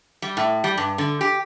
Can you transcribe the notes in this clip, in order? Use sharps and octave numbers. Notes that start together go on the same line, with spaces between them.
G3
A2
G3
G2
D3
G4